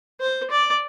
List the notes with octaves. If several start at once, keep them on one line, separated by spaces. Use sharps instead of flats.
C5
D5